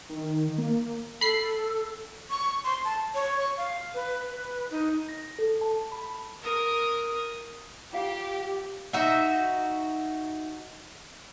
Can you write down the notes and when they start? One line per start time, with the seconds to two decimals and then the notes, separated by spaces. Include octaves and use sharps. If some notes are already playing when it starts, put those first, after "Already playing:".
0.09 D#3
0.58 A#3
1.21 A4 B5 C7
2.30 C#6
2.64 C6
2.84 A5
3.14 C#5
3.39 C#6
3.57 F5
3.94 B4
4.31 B4
4.71 D#4
5.09 A#6
5.39 A4
5.61 A5
5.92 B5
6.42 A#4 D#6
7.93 F4 G4 F5 F#5
8.93 D#4 F#4 E5